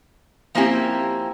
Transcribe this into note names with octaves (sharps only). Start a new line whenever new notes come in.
F3 A#3 C4 C#4 E4 G4